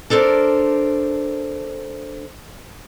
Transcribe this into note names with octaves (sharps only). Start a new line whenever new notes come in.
D4 A4 A#4 C5 D5